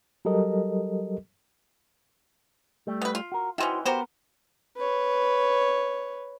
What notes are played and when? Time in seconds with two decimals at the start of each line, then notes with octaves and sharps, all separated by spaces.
0.25 F#3 G3 G4 A4 A#4 D#5
2.87 G3 A3
3.02 B3 B4
3.15 F4
3.32 F#4 A#4
3.58 D#3 E3 C#4 E4 F#4 C5
3.85 B3 F#4 G4 A#4 C5
4.77 B4 C#5